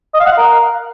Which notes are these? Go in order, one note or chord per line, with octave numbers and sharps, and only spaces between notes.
D#5
F5
F#5
F5
A#4